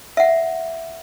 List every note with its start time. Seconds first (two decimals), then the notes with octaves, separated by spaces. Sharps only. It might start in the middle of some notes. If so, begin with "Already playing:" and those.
0.17 E5 F#5